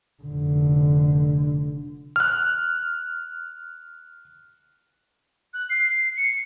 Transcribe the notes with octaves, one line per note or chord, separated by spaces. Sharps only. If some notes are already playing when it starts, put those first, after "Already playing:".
F1 D3
F6 F#6
F#6
C7
C#7